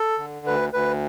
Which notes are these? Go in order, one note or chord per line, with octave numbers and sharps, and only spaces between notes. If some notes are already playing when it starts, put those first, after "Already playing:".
Already playing: A4
D3
D2 B4
D2 B4